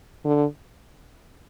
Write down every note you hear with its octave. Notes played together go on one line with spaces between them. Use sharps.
D3